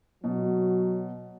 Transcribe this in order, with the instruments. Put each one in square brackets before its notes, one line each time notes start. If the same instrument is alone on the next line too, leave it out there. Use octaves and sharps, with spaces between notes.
[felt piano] B2 [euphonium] F#3